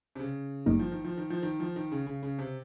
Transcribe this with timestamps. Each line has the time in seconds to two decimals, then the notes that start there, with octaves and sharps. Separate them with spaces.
0.15 C3
0.20 C#3
0.66 G#1 G2 D#3 G3 A#3 D#4
0.79 F3
0.92 D#3
1.05 F3
1.17 D#3
1.30 F3
1.43 D#3
1.60 F3
1.76 D#3
1.92 C#3
2.07 C#3
2.23 C#3
2.39 C3